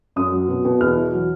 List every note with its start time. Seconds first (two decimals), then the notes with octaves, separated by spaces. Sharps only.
0.16 F#2 D#6
0.32 F#3
0.49 B2
0.65 B2
0.80 E2 F6
0.97 E3
1.13 F#3